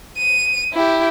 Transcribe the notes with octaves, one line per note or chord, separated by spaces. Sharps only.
D#7
E4 G4